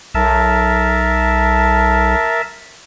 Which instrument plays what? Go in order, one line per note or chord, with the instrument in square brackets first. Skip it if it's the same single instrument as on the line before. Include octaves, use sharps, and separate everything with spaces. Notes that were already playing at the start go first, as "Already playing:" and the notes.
[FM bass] B1 [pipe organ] A#4 E5 A5